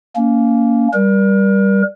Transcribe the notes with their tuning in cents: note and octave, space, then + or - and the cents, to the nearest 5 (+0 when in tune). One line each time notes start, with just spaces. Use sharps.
A#3 -5 C#4 +25
G3 +0 A#4 +35